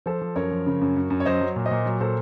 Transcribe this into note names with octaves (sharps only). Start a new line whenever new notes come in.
F3 A4 C5
F3
F#2 A#4 C#5
F3
C#3
F#2
F#2
F#2
C#5
F#3 C5 D#5
F#3
A#2
C5 D#5
A#2
F#3
A#2 A4 C5